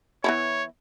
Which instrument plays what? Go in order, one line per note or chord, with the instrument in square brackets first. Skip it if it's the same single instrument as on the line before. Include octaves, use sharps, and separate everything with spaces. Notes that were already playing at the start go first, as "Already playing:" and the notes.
[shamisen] E3 B3 E4 [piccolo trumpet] C#5